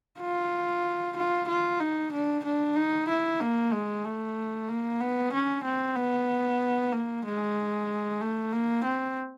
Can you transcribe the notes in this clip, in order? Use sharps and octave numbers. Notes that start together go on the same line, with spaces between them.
F4
F4
F4
D#4
D4
D4
D#4
E4
A#3
G#3
A3
A#3
B3
C#4
C4
B3
A#3
G#3
A3
A#3
C4